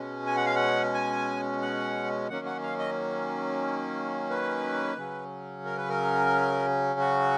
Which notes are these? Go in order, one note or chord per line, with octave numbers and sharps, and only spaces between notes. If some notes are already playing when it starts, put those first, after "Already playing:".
Already playing: B2 G#3 C#4
G#5
F#5
F5
F#5
G#5
F#5
D#3 F#3 A#3 C#4 F#5
F#5
F5
D#5
B4
C#3 F#3 C#4
A#4
B4
A#4
F#4